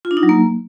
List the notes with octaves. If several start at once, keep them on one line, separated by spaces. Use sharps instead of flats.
F4
D4
D#4
F#3
A#3